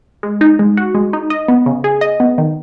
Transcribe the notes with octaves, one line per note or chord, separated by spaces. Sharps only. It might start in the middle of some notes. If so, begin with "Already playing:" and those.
G#3
D#4
G#3
F#4
G#3
D#4
D#5
B3
C#3
G#4
D#5
B3
D#3